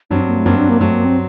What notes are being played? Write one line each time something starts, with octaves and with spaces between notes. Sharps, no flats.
G2 F#3 C4 D4
A#3
A3
G2 F#3 A#3 C4
D4
A#3
G2 F#3 A3 C4
A#3
C4